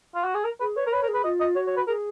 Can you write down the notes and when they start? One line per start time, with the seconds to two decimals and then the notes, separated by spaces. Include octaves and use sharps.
0.15 F4
0.24 F#4
0.35 G#4
0.44 A#4
0.60 G#4 B4
0.76 B4 C#5
0.87 A#4
0.92 B4 C#5
1.02 A#4
1.08 G#4
1.14 B4
1.24 F4 D#5
1.40 D#5
1.55 F#4 C#5
1.67 C#5
1.76 B4
1.87 G#4 A#4